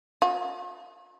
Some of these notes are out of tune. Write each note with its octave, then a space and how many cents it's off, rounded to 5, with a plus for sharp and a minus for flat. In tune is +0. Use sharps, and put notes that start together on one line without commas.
F4 +45